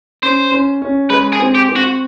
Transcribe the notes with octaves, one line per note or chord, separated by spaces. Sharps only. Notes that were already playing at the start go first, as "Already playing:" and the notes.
C#4 C5
C#4
C#4
G#3 B4
G#4
C4
G4
C4
F#4